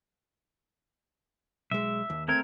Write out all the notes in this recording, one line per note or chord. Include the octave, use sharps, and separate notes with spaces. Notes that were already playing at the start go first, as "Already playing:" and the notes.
B1 G#3 E5
D#2
A3 C4 A#4 G#6